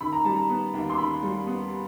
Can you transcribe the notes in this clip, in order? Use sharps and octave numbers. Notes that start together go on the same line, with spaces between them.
D#3 B5
A#5
G3 A5
A#5
B3
D#2
C6
D#3 B5
G3
B3